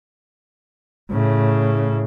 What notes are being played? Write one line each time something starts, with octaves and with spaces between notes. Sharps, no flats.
A2 C#3